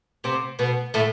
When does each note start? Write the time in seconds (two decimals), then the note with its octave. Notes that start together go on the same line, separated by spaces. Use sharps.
0.24 C3 C4
0.59 B2 B3
0.94 A2 A3